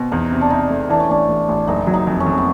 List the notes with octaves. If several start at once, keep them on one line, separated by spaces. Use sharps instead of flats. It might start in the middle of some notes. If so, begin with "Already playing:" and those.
Already playing: B2 C4
E2 D#4
C3
D4
C3 D#4
A3
E3 D4
C#4
A1 D4
A1
A1
F#1 D#4
F#3
D#4
F2
C#4
F2
B3